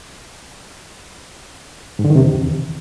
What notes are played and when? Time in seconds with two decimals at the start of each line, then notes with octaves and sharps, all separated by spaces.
1.99 G#2
2.05 D3
2.10 D#3
2.16 C3
2.21 E2